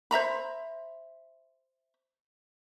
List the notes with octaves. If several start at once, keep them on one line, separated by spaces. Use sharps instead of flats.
C5 E5 A#5 B5